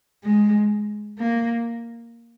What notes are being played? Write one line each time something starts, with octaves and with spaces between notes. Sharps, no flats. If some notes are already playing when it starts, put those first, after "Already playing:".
G#3
A#3